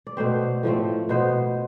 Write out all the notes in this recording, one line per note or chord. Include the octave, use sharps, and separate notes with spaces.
D5
B2 A3 C4 C5
A2 F3 A3 C4
B2 B3 C5